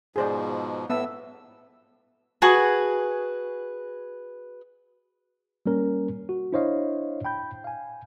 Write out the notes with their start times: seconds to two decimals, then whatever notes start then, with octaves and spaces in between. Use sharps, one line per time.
0.16 G#2 B2 F3 G#4 C5 D5
0.90 A2 B3 E5 A5 E6
2.42 F#4 G#4 B4 C#6
5.66 G3 A#3 C#4 A#4
6.29 F#4
6.53 D4 E4 C5 C#5 D#5 F5
7.25 G5 B5 G6
7.64 F5 G#5